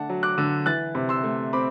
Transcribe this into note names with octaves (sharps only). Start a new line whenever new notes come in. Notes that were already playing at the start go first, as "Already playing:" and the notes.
Already playing: D3 A3 D4 F#5 A5
F#3
D6 F#6
D3
E3 F#6 A6
C3
C6 E6
A3
C4 B5 D6